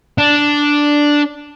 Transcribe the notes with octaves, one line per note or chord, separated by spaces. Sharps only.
D4